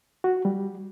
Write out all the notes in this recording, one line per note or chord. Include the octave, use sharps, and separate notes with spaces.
F#4
G3